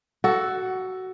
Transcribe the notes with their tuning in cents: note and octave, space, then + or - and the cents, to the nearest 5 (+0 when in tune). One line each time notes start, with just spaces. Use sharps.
F#4 +15 A4 +0